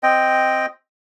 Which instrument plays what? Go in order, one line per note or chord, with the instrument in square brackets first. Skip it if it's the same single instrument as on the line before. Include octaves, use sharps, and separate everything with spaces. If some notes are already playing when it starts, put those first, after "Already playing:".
[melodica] C4 D#5 G5